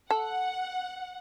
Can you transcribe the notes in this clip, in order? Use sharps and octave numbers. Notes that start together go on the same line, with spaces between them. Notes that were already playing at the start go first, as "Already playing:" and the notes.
A4 F#5